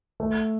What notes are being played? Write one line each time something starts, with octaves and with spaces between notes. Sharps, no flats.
A3